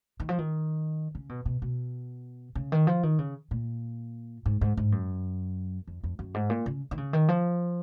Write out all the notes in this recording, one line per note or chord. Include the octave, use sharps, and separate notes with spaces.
D#3
F3
D#3
C#3
B2
B2
B2
C#3
D#3
F3
D#3
C#3
A#2
G#2
G#2
G#2
F#2
F2
F2
F#2
G#2
A#2
C#3
D#3
C#3
D#3
F3